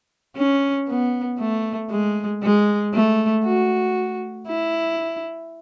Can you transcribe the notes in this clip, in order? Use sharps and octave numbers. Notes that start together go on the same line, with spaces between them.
C#4
B3
A3
G#3
G#3
A3
F#4
E4